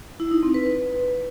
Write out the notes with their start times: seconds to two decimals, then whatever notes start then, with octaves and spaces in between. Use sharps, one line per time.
0.20 E4
0.31 D#4
0.43 C4
0.54 B4